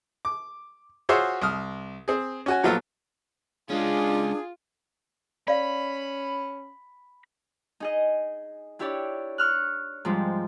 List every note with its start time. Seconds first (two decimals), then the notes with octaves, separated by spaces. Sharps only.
0.25 D6
1.09 F4 F#4 G#4 C5 C#5 E5
1.41 C2 D#6 F6
2.08 C4 G#4
2.46 C#4 F#4 G#5
2.63 A#2 F3 F#3 B3 F4 A4
3.70 G#3 C#4 D4 F4 G#4
5.48 C#4 D5 F5 B5
7.80 D#4 G#4 D#5
8.79 D4 E4 G4 C#5 D5
9.38 C#6 F6 F#6
10.05 G#2 F3 G3 G#3 C4